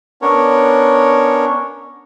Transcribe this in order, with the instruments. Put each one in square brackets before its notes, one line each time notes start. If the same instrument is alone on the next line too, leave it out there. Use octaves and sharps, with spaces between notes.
[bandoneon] B3 C#4 D4 A#4 C#5